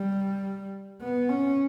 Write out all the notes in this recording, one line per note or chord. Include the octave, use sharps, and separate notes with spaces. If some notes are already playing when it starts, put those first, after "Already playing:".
Already playing: G3
B3
C#4